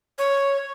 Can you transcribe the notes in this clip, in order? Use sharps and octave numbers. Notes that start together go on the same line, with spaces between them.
C#5